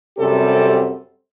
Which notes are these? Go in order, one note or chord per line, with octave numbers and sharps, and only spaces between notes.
F#2 C3 G3 C4 G4 A4